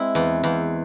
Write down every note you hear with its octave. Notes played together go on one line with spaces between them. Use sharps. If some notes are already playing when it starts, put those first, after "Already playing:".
Already playing: G#3 C4 E4
E2
E2